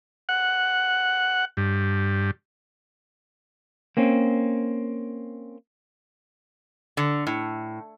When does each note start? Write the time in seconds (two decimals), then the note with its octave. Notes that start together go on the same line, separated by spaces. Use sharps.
0.29 F#5
1.57 G2
3.97 A#3 C4 C#4
6.97 D3
7.27 A2